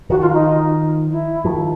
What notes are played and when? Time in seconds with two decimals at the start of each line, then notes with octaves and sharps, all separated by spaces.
0.10 D#3 F3 F#4
0.21 F4
0.33 D#4
1.11 E4
1.45 D#3 F3